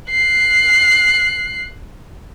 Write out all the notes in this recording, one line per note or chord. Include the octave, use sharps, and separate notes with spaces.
F#6 C7